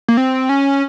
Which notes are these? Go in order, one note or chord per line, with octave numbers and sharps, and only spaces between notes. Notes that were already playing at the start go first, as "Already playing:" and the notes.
A#3
C4
C#4